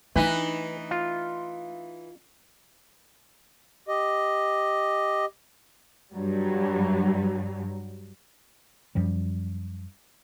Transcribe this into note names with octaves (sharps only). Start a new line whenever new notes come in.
E3 A3 D4 D#4 B4
F4
G4 D#5
G2 F#3 G3
F#2 F3 G3